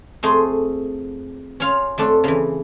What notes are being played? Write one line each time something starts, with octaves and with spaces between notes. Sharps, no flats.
F2 A3 G#4 C6
C#4 F4 C#5 F5
F2 A3 D4 A4
C#3 E3